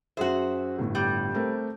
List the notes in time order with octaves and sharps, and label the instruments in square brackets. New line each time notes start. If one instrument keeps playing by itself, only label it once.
[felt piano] F#2 G#4 E5 [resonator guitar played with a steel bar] F#4 C5
[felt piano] G1 A2
[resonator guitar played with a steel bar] G3
[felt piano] A3 C4 A#4